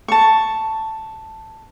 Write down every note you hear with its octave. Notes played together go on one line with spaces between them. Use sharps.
A5 C#6